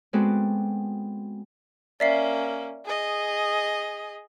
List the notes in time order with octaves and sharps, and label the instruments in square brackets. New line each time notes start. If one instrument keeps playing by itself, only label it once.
[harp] G#3 B3 C4 F#4 A4 D5
[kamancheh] A#3 C#4 [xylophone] D5 E5 C7
[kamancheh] G#4 D#5